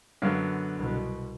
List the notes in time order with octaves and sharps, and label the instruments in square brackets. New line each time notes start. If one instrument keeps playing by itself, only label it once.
[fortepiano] F#2 F5 [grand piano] D3 B3
[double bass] C2 B2